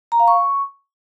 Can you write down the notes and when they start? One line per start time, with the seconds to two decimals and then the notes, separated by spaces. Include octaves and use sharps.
0.12 A#5
0.20 F5
0.28 C#6